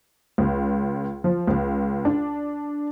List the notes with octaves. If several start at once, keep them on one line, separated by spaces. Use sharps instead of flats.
C#2
F3
C#2
D4